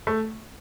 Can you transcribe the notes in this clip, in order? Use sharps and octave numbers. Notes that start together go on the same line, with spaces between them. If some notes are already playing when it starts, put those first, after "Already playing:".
A3